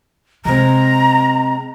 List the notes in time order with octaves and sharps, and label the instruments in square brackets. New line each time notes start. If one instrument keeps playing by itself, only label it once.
[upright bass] C3 [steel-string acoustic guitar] G#3 C4 [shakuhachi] A#5